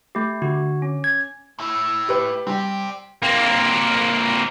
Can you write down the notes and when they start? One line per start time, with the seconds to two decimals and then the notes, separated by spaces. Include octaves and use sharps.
0.15 A3 G4
0.42 D3 F#4
0.82 C#4
1.04 G#6
1.59 A2 E4
2.08 G4 B4
2.47 G3 C4 G4
3.23 A#3 C4